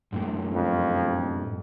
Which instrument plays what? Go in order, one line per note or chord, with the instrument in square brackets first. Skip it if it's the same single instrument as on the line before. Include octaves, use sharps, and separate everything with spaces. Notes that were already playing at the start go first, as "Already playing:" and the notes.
[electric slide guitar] F#2 A2
[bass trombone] F2